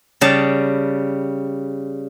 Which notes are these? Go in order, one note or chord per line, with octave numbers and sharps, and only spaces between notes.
C#3 G3 A5